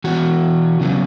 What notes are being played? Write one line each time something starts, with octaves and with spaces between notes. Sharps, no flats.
E3 B3 F#4
C#3 F#3 B3